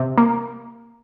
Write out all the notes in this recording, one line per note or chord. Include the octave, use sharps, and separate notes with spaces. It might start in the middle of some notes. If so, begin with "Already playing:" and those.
Already playing: C3
A#3